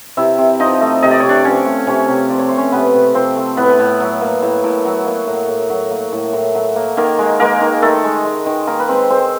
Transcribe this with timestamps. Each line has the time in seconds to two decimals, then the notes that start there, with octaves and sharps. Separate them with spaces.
0.17 C3 E4 E5
0.38 C3
0.59 F3 D#4 D#5
0.81 A3
1.03 C3 D#5
1.11 D5
1.20 C3 C#5
1.29 D4 D5
1.44 F3 C#4 C#5
1.66 A3
1.87 C3 C#4 C#5
2.09 C3
2.30 F3 D5
2.39 C#5
2.49 A3 C5
2.57 C#4 C#5
2.72 C3 B3 B4
2.94 C3
3.14 F3 C4 C5
3.37 A3
3.57 A2 B3 B4
3.79 A2
4.00 F#3
4.21 A#3
4.42 A2
4.64 A2
4.85 F#3
5.07 A#3
5.27 A2
5.49 A2
5.70 F#3
5.91 A#3
6.13 A2
6.33 A2
6.55 F#3
6.76 A#3
6.97 D#3 A#3 A#4
7.18 G#3
7.40 G#3 A#3 A#4
7.61 D#3
7.82 D#3 A3 A4
8.04 G#3
8.25 G#3
8.46 D#3
8.67 D#3 A#3 A#4
8.80 B4
8.88 G#3 C4 C5
9.10 G#3 C4 C5